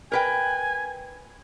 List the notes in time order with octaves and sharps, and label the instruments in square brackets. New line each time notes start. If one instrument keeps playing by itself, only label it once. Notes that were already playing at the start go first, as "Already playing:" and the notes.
[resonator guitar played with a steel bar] A#4 B4 G5 [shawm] G#5